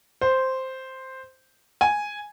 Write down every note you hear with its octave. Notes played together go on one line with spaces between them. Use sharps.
C5
G#5